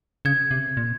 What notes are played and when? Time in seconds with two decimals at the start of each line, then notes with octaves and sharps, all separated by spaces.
0.25 C#3 G#6
0.51 C3
0.77 A#2